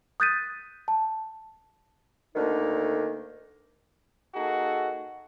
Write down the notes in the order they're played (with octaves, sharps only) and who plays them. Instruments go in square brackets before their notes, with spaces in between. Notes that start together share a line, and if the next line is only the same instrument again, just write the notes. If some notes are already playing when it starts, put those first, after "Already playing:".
[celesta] D#6 F#6 G6 A6 B6 D#7
A5
[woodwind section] D2 D3 D#3 A#3 D#4
[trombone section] A#3 D#4 F#4 G#4 A4